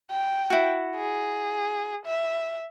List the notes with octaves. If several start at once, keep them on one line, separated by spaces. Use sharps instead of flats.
G5
E4 F#4
G#4
E5